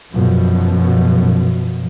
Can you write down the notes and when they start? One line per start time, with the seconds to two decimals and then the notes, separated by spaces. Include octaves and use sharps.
0.14 F#2 B2 F3